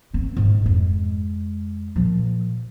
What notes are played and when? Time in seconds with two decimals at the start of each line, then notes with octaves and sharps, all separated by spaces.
0.14 A#3 C4
0.37 G#2
0.64 F2 G#3
1.96 A#2 F3